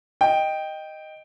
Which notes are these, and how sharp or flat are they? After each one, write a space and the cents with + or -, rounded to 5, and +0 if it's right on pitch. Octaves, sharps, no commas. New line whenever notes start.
D#5 +0 G5 +0